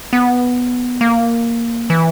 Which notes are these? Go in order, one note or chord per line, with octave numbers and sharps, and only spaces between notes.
B3
A#3
E3